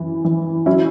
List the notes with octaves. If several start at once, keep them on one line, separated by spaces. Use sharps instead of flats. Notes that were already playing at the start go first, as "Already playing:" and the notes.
Already playing: F#2 E3
E3
F#3 C#4 E4